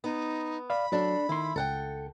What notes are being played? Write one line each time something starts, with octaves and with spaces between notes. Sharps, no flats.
B3 D#4
D5 F5 B5
D2 F#3 D4 A4
D#3 E4 C6
C#2 A4 F#5 G5